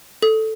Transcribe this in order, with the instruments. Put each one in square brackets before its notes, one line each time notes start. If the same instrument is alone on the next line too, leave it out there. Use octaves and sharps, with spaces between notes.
[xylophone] A4